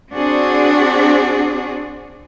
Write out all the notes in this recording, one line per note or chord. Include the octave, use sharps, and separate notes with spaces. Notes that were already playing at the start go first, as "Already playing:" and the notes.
C4 D4 F#4 G#4